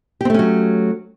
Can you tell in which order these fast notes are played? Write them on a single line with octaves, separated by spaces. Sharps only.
G4 C4 A3 C#4 F#3